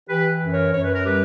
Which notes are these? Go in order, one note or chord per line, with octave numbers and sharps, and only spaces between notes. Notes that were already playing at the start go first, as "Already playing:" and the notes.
E3 G4 B4
F#2
A#4 C#5
F#2 C#5
B4
A#4
G3 G4 B4